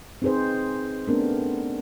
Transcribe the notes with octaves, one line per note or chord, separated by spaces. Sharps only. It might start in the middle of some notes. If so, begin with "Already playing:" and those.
C4 D#4 G#4 B4 C5
A3 B3 C4 D4 A#4